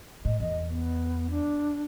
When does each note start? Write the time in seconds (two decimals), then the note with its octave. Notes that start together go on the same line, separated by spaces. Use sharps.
0.25 A2 D#5
0.40 E2 D#5
0.69 B3
1.30 D4